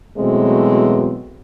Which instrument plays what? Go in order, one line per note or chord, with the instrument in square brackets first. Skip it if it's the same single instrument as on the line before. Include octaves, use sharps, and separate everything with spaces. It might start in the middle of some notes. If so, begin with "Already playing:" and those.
[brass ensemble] B2 E3 F#3 G#3 A3 C4